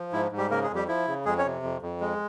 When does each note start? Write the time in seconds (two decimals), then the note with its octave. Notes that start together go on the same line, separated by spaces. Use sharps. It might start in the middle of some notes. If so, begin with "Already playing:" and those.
Already playing: F3
0.13 G#2 E4
0.32 G#2
0.37 G3 G4
0.50 C#3 A#3 A#4
0.63 G#3 G#4
0.70 F2
0.75 G3 G4
0.88 F3 E4
1.07 C#3
1.25 F2 G#3 G#4
1.38 C#4 C#5
1.45 C3
1.63 F2
1.82 F2
2.01 G#3